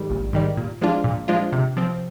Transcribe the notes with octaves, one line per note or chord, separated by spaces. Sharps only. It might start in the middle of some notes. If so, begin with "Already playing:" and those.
Already playing: G#2 D#3 G3
A#1
G#2 D#3 G3
A#2
F3 G#3 D4 F4
A#2
F3 G#3 D4 F4
C3
F3 C4